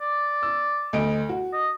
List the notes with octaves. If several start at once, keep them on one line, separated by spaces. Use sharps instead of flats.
D5
E6
D2 D#5 D7
F#4
D#5